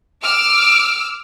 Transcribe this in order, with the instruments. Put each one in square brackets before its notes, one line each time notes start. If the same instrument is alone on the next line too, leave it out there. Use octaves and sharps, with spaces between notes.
[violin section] D6 E6 F6 D7